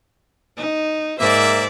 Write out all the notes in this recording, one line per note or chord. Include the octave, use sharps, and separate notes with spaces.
D#4
G#2 A#3 A#4 C5 D5 E5